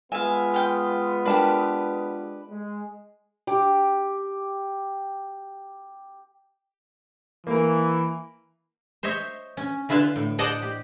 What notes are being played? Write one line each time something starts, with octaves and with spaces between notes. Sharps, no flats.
G#3 B3 F4 E5 F5 G#5
F5 G5
D4 G4 A#4 B4 A5
G#3
G4 D6
E3 A#3 A#4
C5 C#5 D#5 E5
C#4
D3 E4 F4 B4 E5 F5
A2
C5 D5 D#5 F#5 A5
G4